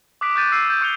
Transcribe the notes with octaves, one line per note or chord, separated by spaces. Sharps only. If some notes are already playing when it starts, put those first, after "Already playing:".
D6 D#6 F#6 B6 D7
C#6 F#6 G6 A6 D#7
E6 C7 D#7
G6 A6
C#6 F#6 C#7 F7 G7